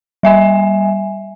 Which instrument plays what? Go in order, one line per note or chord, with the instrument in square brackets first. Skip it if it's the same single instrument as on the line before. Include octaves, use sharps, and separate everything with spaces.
[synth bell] G3 E5 G#5